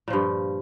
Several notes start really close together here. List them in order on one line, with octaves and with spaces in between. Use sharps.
A#2 F3 G2